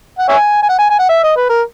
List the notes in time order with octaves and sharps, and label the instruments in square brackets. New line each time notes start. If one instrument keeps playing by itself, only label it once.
[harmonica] F#5
C#5 E5 G#5
G#5
F#5
G#5
G#5
F#5
E5
D#5
B4
A#4